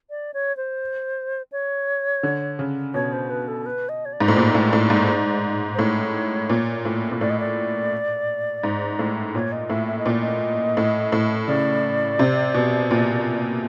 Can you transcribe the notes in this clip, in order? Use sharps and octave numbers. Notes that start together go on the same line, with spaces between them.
D5
C#5
C5
C#5
D3
C#3
B2 C#5
C5
B4
A4
B4
D#5
C#5
D5
G#2
A2
A#2
A2
A2
G#2
C5
A2 C#5
A#2
A2
A#2
A2 D5
D#5
D5
G#2
A2
A#2 C#5
D#5
A2 E5
E5
D#5
A#2 D5
D#5
A2
A2
C#3 D5
C3
B2
A#2